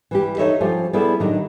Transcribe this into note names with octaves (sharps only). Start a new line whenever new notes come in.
E3 G3 G4
D#4 F#4 A4 C#5 D#5 E5
F3 G3 C#4 F4 G4 A4
G3 B3 E4 G#4 A4 D5
A2 D#3 F#3 G3 D4 D#4